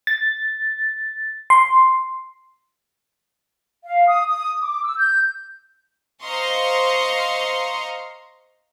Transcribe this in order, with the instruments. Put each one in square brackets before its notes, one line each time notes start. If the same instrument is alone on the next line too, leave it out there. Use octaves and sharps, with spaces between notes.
[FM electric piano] A6
C6
[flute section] F5
D#6
D#6
D6
E6
G6
[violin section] C5 D#5 F5 A#5 C6 C#6